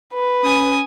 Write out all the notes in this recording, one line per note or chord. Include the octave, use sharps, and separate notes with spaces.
B4
C#4 G#5 D#6